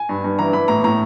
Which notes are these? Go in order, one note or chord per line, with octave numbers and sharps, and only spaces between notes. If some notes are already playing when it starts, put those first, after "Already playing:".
Already playing: G#5
G2
G2
E3 A#5
E3 B5
A2 A#5
A2 A#5